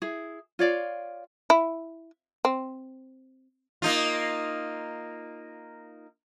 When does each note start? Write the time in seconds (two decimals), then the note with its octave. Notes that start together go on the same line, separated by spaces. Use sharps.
0.02 E4 G#4
0.59 F4 C#5 D5 F5
1.50 E4
2.45 C4
3.82 A#3 D#4 F4